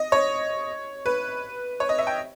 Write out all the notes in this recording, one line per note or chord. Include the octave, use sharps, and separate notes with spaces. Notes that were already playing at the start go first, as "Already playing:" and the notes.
Already playing: D#5
C#5
B4
C#5
D#5
E5
G5